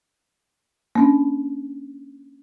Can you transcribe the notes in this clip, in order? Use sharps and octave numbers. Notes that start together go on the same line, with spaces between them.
A#3 C#4 D4